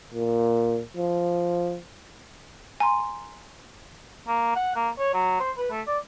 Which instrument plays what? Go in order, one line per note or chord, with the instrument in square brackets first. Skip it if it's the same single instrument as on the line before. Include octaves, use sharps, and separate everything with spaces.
[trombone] A#2
F3
[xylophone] G#5 A#5 C6
[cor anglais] A#3
F#5
A#3
C#5
F#3
C5
B4
A3
D5